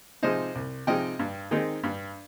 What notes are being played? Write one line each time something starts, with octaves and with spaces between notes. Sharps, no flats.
C3 F3 G#3 D#4 C5 D#5
C2
C3 F3 G#3 D#4 D#5 G5
G2
D#3 G#3 C4 D#4
G2